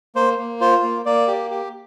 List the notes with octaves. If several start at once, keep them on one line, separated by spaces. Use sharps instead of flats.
A#3 C5
A#3
F4 C5
A#3
A#3 D5
G4
G4